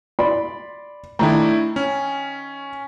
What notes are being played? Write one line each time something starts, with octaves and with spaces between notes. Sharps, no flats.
D5 B5 C6
D#3 A3 D4 E4 A#5
C#4